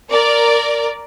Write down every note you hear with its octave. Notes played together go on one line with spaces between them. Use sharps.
A#4 D5